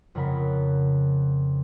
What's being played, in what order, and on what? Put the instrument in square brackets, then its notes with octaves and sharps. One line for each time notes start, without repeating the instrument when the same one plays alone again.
[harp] F2 C#3 A#4 F#5 B5